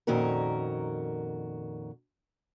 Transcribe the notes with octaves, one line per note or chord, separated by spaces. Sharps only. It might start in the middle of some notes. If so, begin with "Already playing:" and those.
F2 A#2 D#3 C#4 F#4 A#4